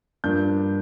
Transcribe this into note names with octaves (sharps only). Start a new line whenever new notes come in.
G2 F3 A#3 D4 G6